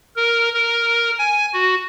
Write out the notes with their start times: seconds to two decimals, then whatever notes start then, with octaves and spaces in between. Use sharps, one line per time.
0.16 A#4
0.54 A#4
1.19 G#5
1.54 F#4